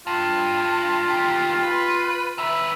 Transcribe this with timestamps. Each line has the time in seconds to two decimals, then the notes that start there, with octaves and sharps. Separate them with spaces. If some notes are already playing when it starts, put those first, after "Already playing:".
0.07 G2 F4
1.08 D#2 G4
1.63 B4
2.38 D#3 B4 E5